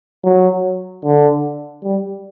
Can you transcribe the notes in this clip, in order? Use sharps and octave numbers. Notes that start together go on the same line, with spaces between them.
F#3
D3
G3